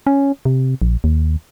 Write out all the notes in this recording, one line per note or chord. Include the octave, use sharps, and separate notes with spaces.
C#4
C3
A#1
D#2